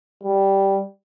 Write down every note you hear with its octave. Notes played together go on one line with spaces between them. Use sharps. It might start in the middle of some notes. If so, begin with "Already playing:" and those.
G3